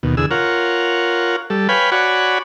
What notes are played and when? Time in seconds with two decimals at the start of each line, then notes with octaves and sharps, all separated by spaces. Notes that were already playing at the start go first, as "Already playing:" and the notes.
0.03 D#2 B2
0.17 E2 D3 G#4 E6
0.31 F4 A#4 C#5 F#5
1.50 G3 A4
1.69 B4 C#5 F5 G5 G#5 B5
1.92 F#4 C#5 D5 F#5 G#5 B5